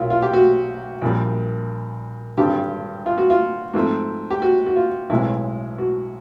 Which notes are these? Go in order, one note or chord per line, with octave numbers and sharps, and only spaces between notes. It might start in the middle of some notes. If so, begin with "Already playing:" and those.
Already playing: B1 A#2 F#3 A#3 E4 F4
F4
G4
F#4
A#1 A#2 G3
G#1 G2 D3 G3 C4 G4
F4
F#4
F4
G#2 F3 A3 C4
G4
F#4
F#4
F4
B1 A2 E3 G#3 C4 E4
F#4